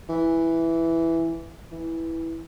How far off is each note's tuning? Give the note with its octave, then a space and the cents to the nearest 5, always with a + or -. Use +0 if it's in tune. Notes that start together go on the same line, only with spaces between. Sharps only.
E3 +0
E3 -10